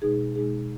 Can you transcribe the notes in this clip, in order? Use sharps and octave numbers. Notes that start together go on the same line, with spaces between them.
B2 G#3 D#4 G#4
B2 G#3 D#4 G#4